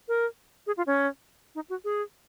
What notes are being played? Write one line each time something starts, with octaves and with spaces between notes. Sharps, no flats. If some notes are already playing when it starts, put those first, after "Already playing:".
A#4
G#4
F4
C#4
D#4
F#4
G#4